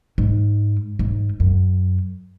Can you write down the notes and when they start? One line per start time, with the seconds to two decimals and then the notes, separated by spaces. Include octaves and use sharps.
0.18 G#2
0.99 G#2
1.40 F#2